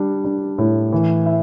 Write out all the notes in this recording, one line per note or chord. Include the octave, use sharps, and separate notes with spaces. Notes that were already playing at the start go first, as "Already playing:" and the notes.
Already playing: G3 D4
D4
A2
E3
E4